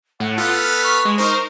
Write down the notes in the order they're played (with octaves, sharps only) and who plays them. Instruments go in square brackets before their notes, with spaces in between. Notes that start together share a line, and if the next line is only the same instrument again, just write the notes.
[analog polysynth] A2 [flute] F#5
[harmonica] B3 A4 B4 [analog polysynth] F4
[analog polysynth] F6 B6 [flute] F#6
[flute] C#6
[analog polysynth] G#3
[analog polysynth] D#4 A#4 C5 [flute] C#6